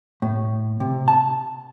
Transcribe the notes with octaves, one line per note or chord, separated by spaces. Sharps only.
A2
C3
A5